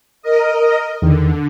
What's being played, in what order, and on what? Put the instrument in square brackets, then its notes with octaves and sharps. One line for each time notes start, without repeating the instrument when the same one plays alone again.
[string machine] A#4 D#5
[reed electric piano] E2 D#3 [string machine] D3